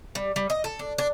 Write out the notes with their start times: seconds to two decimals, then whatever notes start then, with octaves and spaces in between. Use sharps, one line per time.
0.15 G3
0.36 G3
0.50 D#5
0.64 A4
0.79 D4
0.98 D4